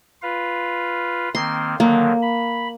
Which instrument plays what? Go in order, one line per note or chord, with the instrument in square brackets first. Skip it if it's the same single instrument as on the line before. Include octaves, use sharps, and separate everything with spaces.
[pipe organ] F4 B4 F5
[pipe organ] D#3 A#3 C4 [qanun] C6
[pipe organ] D3 D#3 F#3 [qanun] A#3
[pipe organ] B5